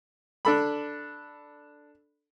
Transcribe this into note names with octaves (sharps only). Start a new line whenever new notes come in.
D4 A4 B5